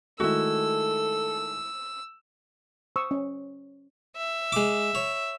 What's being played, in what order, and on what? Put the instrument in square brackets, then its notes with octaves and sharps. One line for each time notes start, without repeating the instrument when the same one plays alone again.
[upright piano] D#3 G#3 A3 [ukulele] E4 F#4 [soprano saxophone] A4 [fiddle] E6
[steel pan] C5 C#6 D#6 E6
C#4
[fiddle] E5
[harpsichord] G#3 D6
C#5